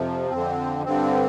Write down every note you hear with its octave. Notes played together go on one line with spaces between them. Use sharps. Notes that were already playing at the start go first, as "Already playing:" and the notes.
Already playing: F2 C3 F3
F2 D3 C4
G2 D3 C4